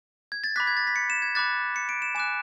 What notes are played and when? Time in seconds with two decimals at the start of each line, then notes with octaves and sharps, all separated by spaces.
0.32 G#6
0.44 A6
0.56 B5 D6 F#6 B6
0.67 G#6
0.77 A6
0.87 B6
0.96 C#7
1.10 E7
1.22 G#6
1.35 B5 D6 F#6 A6
1.76 C#7
1.89 D7
2.02 E7
2.15 G#5 D6 F#6 E7